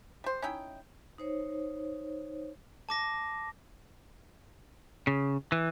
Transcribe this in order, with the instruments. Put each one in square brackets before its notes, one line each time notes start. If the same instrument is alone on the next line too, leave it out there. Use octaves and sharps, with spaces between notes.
[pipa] G3 C5
C#4 D#4 E4 G5
[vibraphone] D#4 C5 C#5
[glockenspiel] A5 D6 A#6
[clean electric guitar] C#3
E3